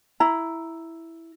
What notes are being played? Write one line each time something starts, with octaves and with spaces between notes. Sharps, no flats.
E4 A#5